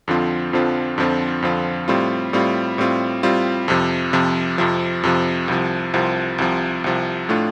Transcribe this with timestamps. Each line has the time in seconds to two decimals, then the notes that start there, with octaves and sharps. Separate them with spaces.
0.08 F2 D3 F3 C4 F4
0.53 F2 D3 F3 C4 F4
0.98 F2 D3 F3 C4 F4
1.42 F2 D3 F3 C4 F4
1.88 A2 G3 C4 F4
2.33 A2 G3 C4 F4
2.78 A2 G3 C4 F4
3.23 A2 G3 C4 F4
3.68 F2 C3 F3
4.13 F2 C3 F3
4.58 F2 C3 F3
5.03 F2 C3 F3
5.48 C2 C3 F3
5.93 C2 C3 F3
6.38 C2 C3 F3
6.84 C2 C3 F3
7.29 A2 A3 D4 F4